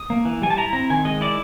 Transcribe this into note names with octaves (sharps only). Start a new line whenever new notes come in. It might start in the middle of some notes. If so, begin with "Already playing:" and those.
Already playing: D#6
A#3
E3
G3 G#5
A5
E4 A#5
C4 A#5
D#3 G#5
G#3 D#5
E4 D5